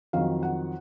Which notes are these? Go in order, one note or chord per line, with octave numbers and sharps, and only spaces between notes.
F2 D#3 F#3 F5
F#5